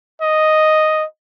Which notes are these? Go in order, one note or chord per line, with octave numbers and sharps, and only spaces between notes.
D#5